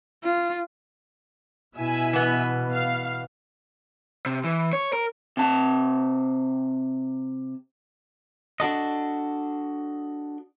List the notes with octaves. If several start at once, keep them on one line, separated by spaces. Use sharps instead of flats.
F4
B2 E4 E5 G#5
E3 B3
F5
C3
E3
C#5
A#4
C3 A5
D4 F#4 A4 D#5